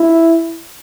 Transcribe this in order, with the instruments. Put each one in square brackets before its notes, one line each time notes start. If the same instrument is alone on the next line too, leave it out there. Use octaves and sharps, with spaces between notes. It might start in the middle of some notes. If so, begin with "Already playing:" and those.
Already playing: [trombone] E4